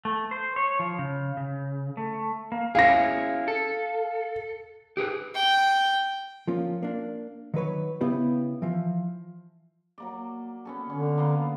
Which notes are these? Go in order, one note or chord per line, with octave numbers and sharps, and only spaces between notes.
A3
C5
C#5
F3
C#3
C#3
A3
A#3
C#4 E4 G#4 F5 A#6
A4
G4 G#4 B4
G5
F3 A#3 C#4 F4
A#3 D4
D#3 F#3 B4 C#5
C#3 B3 E4 G4
E3 F3
F#3 A#3 D5
B3 C#4 A4
D3 C#4
A#3 B3 F5